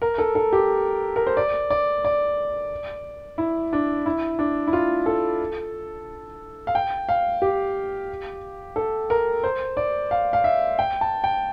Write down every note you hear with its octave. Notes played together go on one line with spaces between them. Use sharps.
A#4
A4
A4
G4
A#4
C5
D5
D5
D5
E4
D4
E4
D4
E4
F4
A4
F5
G5
F5
G4
A4
A#4
C5
D5
F5
F5
E5
G5
A5
G5